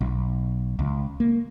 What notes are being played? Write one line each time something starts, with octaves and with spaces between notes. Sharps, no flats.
B1
C#2
A#3